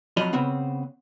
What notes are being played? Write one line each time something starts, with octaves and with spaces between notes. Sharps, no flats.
F2 F#3 F4 D#5 B5
C#3 B3 C4